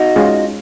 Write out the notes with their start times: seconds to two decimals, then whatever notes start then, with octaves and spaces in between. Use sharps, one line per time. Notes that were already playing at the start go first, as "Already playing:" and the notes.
Already playing: D#4 F#4
0.16 G#3 C#4 F4 G#4